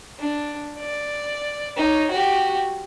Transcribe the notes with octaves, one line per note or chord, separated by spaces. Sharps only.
D4
D5
D#4 C#5
F#4 G4